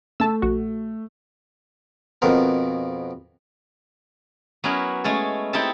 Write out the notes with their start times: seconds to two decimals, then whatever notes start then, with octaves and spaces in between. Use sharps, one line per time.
0.20 A3 A5 E6
0.42 A#1 F#4
2.22 F2 B2 A#4
4.64 F#3 B3 C#4 E4 A#4
5.04 G#3 A3 C#4 A4
5.53 C4 D#4 E4 G4 A4 A5